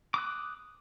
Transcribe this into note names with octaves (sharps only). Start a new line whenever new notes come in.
D6 D#6 F#6